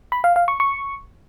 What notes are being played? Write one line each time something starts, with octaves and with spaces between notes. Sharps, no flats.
B5
F5
F5
C#6
C#6